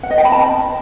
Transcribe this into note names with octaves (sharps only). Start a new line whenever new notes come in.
F#5
D#5
G5
B5
A5